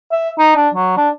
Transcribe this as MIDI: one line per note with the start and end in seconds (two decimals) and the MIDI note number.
0.12 0.30 76
0.38 0.53 63
0.56 0.69 62
0.74 0.94 54
0.97 1.09 62